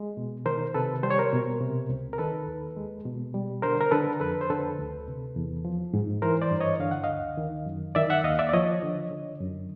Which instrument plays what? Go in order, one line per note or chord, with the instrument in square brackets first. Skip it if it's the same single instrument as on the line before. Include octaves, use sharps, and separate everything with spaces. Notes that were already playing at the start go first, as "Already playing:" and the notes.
Already playing: [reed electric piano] G#3
B2
D#3 A#4 C5
C3 A4 B4
G3 C5
C#5
A#4 C5
B2
C3
C#2
A#4
D#3 A4 B4
D#2
G#3
B2
G3
D3 A#4 C5
A#4
D3 A4 B4
F2 A4 B4
C5
D3 A4 B4
D2
C3
E2
F3
G#2
E3 A#4 C5
C5 D5
G2
C#5 D#5
D3 F5
F#5
D#5 F5
D2
D#3
F#2
D#3 D5 E5
E5 F#5
D#2 D#5 F5
D5 E5
D5
F3 C#5 D#5
D3
D3
F#2